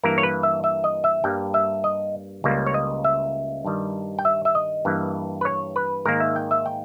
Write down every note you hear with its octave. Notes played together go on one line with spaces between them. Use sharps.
G2 E3 A#3 A#4
C#5
B4
E5
E5
D#5
E5
G2 G3 A#3 G5
E5
D#5
C#2 C#3 G3 A#3
C#5
D#5
E5
G2 D#3 G3
G5
E5
E5
D#5
G2 E3 A#3
B4
C#5
B4
G#2 D#3 A#3 A#4
E5
G5
E5
G5